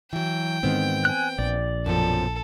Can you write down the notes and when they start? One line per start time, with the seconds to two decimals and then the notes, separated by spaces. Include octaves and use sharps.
0.13 E3 F#3 G5
0.63 G#2 D#3 G#3 B3 C4
1.05 G#5 F#6
1.38 A#1 D5
1.86 F#2 B2 F3 A4